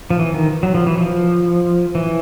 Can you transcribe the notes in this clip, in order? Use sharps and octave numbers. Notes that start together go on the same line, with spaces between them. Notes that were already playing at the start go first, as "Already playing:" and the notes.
F3
E3
D#3
F#3
F3
E3
F3
E3